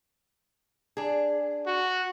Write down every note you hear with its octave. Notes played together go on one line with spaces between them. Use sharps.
D4 G#4
F#4